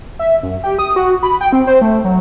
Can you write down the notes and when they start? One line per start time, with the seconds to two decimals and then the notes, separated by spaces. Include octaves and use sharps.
0.19 E5
0.43 F#2
0.63 G4
0.79 D#6
0.96 F#4
1.23 B5
1.41 G5
1.52 C4
1.67 C5
1.82 A3
2.04 F#3